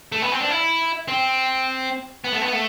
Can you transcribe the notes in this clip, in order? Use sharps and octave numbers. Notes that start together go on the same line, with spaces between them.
A3
B3
C4
D4
E4
C4
B3
A3
B3
A3